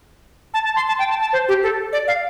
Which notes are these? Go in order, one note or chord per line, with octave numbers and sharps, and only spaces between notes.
A5
A5
C6
A5
G5
A5
A5
C5
G4
A4
D5
F5